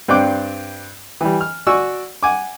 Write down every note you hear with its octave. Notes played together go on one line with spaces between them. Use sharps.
G2 C4 D5 G5 D6 F#6
E3 G3
F6
F#4 D5 G#5 C#6 E6
F#5 G#5 D6